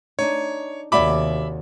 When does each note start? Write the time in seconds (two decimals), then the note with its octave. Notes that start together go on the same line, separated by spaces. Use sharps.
0.19 D4 D#4 C#5
0.92 D#2 C3 F#4 G#4 D5 E5 B5 D6